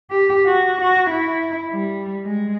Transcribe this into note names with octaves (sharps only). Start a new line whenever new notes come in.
G4
F#4
F#4
E4
G3
G#3